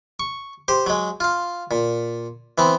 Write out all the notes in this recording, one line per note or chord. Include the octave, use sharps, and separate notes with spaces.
C#6
G4 C5
F#3 G#3
F4 F5
A#2
E3 B3 C4